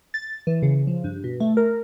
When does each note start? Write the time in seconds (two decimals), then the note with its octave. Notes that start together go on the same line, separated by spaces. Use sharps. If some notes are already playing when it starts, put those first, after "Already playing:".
0.14 A6
0.47 E3
0.62 C#3
0.87 F3
1.04 G2
1.24 B2
1.40 A3
1.57 A#4